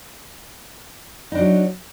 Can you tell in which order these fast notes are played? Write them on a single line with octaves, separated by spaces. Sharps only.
D#4 D4 F#3